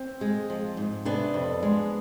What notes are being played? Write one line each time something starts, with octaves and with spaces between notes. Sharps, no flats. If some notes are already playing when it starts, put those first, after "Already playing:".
Already playing: C4
G#3
F3
G#2
C3 B3 D4
F2
G#3